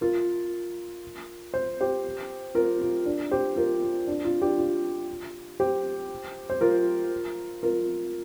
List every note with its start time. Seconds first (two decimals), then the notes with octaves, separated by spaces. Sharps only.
0.01 F4 A#4
1.54 C5
1.81 G4 C5
2.55 F4 A#4
2.81 F4
3.06 D4
3.31 G4 C5
3.56 F4 A#4
3.82 F4
4.08 D4
4.25 F4
4.41 D4 G4
4.58 F4
5.60 G4 C5
6.50 C5
6.61 F4 A#4
7.63 F4 A#4